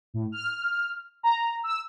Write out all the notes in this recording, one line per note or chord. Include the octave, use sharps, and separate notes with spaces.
A2
F6
A#5
E6